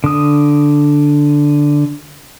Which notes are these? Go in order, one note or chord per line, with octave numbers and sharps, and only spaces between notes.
D3 D#6